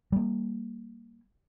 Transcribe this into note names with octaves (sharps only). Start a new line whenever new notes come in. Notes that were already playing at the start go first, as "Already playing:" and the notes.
G3 A#3